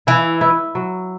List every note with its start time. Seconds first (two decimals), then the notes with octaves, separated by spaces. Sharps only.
0.07 E3 E4
0.41 E4
0.75 F#3